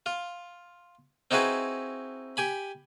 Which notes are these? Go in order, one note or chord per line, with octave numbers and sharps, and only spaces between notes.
F4
C4 D#4 E4 F#4 G#4 B4
G4 G#5 B5